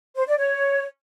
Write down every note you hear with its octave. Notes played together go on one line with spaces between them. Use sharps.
C5
D5
C#5